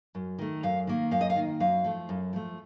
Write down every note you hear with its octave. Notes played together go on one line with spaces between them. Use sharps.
F#2
D#3 A3
F#2 F5
D#3 A#3
F#2 F5
D#5
F5
D#3 A#3
F#2 F5
F3 A3
F#2
F3 A3